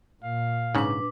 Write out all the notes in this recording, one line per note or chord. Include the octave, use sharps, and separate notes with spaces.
A#2 F5
G#2 C#3 D4 B4 D6